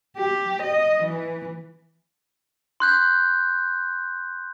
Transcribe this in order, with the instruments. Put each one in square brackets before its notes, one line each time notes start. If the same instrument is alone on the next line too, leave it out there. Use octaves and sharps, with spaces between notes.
[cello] G4
D#5
E3
[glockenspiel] C6 F#6 G6